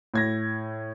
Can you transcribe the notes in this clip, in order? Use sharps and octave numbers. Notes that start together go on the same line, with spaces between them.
A2 G#6 A#6